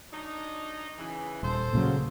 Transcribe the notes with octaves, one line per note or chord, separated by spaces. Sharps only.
F#3 D4 D#4
C#3 E3
D#1 A4 C5
A#2 C#3 F#3